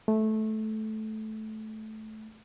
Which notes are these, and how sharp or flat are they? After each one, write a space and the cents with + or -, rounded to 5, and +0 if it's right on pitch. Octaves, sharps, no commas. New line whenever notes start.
A3 -15